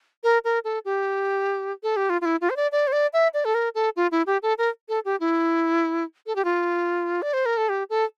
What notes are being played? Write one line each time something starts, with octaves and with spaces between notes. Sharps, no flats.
A#4
A#4
A4
G4
A4
G4
F4
F4
E4
F4
C5
D5
D5
C5
D5
E5
D5
A4
A#4
A4
F4
E4
G4
A4
A#4
A4
G4
E4
A4
G4
F4
D5
C5
A#4
A4
G4
A4